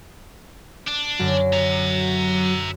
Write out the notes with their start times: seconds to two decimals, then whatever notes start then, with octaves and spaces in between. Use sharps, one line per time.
0.87 D4
1.19 F#2 D3 F#3
1.53 E5 A#5